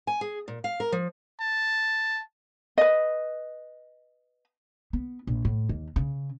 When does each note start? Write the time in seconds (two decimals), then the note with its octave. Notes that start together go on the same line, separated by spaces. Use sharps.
0.07 G#5
0.21 G#4
0.48 A#2
0.64 F5
0.80 A#4
0.92 F3
1.41 A5
2.78 B4 D#5
4.93 B3
5.27 A#1
5.45 A2
5.69 D#2
5.96 C#3